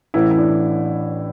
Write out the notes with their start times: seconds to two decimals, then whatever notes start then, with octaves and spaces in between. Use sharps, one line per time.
0.14 A1 A2 E3 E4
0.31 E4
0.38 D4